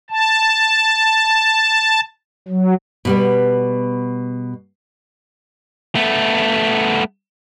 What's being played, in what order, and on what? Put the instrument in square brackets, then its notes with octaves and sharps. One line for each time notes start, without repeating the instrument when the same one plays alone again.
[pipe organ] A5
F#3
[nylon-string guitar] B2 G3 B3
[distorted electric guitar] A3 B3